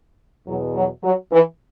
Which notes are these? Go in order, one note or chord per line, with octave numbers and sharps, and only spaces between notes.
E2 B2 F#3
F#3
F#3
E3